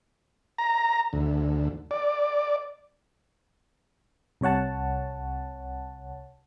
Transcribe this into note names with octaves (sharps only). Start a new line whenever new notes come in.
A#5
D2
D5
C2 C3 C#5 F#5 A5